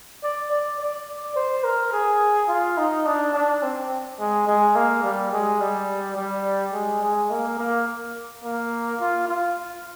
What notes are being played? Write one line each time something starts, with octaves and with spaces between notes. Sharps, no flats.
D5
D5
D5
C5
A#4
G#4
F4
D#4
D4
D4
C4
G#3
G#3
A#3
G3
G#3
G3
G3
G#3
G#3
A#3
A#3
A#3
F4
F4